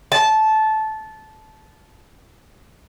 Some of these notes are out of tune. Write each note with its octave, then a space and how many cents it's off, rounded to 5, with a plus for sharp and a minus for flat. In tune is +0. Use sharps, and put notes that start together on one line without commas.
A5 -15